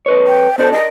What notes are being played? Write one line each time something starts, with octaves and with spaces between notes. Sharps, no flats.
F2 B4 C#5
G5
B2 D4 A4 C5
D4 G#4 A#4 D#5